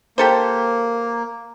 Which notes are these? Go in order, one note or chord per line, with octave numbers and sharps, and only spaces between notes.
A#3 G4 A4 C5